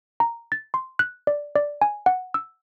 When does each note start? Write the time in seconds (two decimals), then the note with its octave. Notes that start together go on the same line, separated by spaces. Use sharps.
0.20 A#5
0.52 A6
0.74 C6
0.99 F#6
1.27 D5
1.56 D5
1.81 G#5
2.06 F#5
2.34 E6